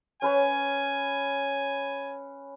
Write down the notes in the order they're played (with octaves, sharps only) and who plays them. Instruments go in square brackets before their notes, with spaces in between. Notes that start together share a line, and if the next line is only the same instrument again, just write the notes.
[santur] C#4 B4 C#5 [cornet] G#5